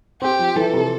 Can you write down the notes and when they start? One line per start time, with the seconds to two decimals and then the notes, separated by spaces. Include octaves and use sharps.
0.21 C4 G4
0.39 F3
0.56 E3 A4
0.73 C3